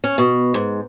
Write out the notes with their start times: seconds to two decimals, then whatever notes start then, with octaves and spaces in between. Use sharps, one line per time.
0.04 C#4
0.18 B2
0.54 G#2